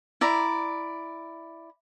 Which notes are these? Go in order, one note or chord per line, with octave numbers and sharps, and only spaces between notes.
E4 D5 A#5